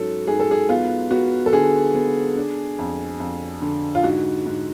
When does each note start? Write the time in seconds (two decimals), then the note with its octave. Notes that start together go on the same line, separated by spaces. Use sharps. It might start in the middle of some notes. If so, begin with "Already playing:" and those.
Already playing: G#2 F#3 C#4 A4
0.27 G#2 G#4
0.40 A4
0.51 G#4
0.69 B3 F4
1.11 B3 F#4
1.46 A4
1.53 D3 G#4
1.94 B3
2.37 D4
2.79 F2
3.20 F2
3.62 D3
3.95 F4
4.03 G#2 F#4
4.46 G#2